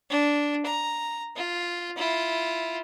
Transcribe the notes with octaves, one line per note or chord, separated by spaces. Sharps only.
D4
A#5
F4
E4 F4